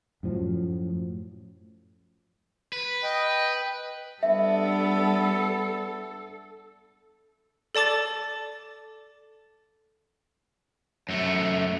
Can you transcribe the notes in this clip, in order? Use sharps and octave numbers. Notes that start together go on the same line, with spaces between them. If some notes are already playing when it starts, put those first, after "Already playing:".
F#2 A2 F3 F#3
B4
D#5 G5
G3 B3 D4 A4 E5
A4 D5 A5 D6 A6
F#2 A3